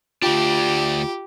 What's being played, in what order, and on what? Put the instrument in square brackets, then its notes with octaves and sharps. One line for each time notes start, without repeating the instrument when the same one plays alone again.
[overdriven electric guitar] D2 D4 [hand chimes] F4 [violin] G4